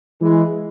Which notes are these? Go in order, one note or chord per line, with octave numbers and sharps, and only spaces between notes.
E3 G#3